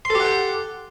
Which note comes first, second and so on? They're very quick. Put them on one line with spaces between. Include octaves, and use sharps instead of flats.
C6 A4 G4 F#5 G5